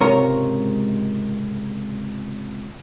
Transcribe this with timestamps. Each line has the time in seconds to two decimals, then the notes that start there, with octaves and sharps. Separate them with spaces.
0.01 C#2 G#2 C3 A#4 C#5